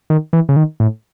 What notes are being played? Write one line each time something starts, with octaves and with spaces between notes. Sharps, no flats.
D#3
E3
C#3
D#3
A2